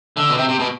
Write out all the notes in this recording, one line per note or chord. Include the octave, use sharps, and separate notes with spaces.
D3
B2
C3
C3
B2